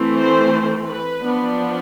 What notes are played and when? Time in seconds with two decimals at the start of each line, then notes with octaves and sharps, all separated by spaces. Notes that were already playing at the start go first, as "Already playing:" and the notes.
Already playing: E3 A3 C4
0.18 C5
0.88 B4
1.22 F3 B3 D4